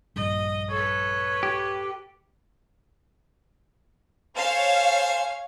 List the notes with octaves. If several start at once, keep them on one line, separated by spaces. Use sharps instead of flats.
A#1 G2 D#5
A4 B4 C#5
G4
A4 C5 C#5 F5 G#5